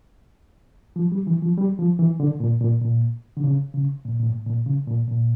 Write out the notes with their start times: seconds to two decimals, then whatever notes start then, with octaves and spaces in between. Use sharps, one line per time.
0.96 F3
1.12 G3
1.27 E3
1.42 F3
1.58 G3
1.79 F3
1.99 E3
2.20 D3
2.40 A#2
2.61 A#2
2.82 A#2
3.37 D3
3.44 C#3
3.74 C#3
4.05 A#2
4.19 A#2
4.26 A2
4.46 A#2
4.66 C#3
4.87 A#2
5.08 A#2